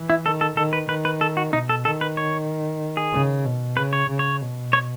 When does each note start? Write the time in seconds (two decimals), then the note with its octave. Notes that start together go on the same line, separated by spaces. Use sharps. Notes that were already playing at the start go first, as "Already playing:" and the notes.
Already playing: E3
0.10 E4
0.25 D#3 A4
0.41 A4
0.57 D#3 A4
0.73 B4
0.89 D#3 B4
1.05 B4
1.21 A4
1.37 F#4
1.53 B2 D#4
1.69 A4
1.85 D#3 A4
2.01 B4
2.17 C#5
2.97 G#4
3.13 C#3
3.45 B2
3.77 C#3 B4
3.93 C#5
4.09 C#3
4.19 C#5
4.41 B2
4.73 C#5